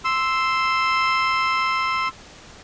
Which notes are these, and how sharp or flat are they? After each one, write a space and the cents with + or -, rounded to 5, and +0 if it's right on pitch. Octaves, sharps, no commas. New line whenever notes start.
C6 +0 E6 +0